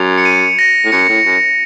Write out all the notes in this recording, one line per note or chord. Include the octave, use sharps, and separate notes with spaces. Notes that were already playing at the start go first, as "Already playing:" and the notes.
Already playing: F#2 F7
C#7
D#7
A#6
A2
F#2 C#7
A2
F#2